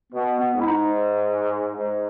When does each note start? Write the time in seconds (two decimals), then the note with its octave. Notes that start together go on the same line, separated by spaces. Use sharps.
0.12 B2 B3
0.40 B3
0.53 G#2
0.60 E4
0.67 D#4
1.76 G#2